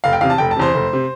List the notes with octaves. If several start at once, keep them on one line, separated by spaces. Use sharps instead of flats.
F1 F5
G5
E2 C3 F5
A5
F1 G5
A5
E2 C3 C5
F1
C3